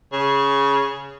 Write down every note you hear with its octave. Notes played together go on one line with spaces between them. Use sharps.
C#3